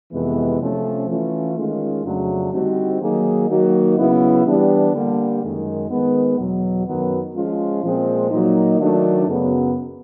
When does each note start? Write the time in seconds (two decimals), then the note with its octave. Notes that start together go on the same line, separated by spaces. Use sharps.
0.11 F2 C3 E3 G#3 B3
0.60 C3 F3 A3 C#4
1.08 E3 A3 C#4 F4
1.55 D#3 G#3 C#4 F4
2.04 F2 C#3 F#3 A3 D4
2.52 D3 G3 C4 D#4 F#4
3.00 D#3 F#3 A#3 D#4 G#4
3.48 D#3 F#3 A#3 D#4 F#4
3.97 C#3 F#3 B3 E4
4.45 E3 G3 B3 D4 G4
4.93 D3 G3 A#3
5.42 F#2 D#3 G#3
5.90 D#3 G#3 B3
6.38 E2 B2 F#3
6.86 F#2 D#3 F#3 B3
7.34 F3 G#3 C#4 F4
7.82 A#2 F3 G#3 C4
8.30 A#2 F#3 A#3 D#4
8.78 D#3 F#3 A3 D4
9.27 F#2 C#3 F#3 B3